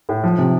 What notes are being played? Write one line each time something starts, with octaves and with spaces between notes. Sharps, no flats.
A2
F3
C3